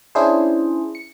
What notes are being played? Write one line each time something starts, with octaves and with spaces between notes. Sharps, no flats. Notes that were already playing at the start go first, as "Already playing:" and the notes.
C#4 D4 E4 G#4 C5
C#7